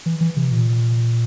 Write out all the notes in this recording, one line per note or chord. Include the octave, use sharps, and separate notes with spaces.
E3
E3
C3
A#2